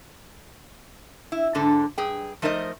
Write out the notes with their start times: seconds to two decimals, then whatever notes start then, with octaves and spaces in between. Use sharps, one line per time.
1.32 E4
1.55 G#2 D3 D4 A4
1.98 G2 G#4 G5
2.42 F3 A3 D#4 A#4 C5 D#5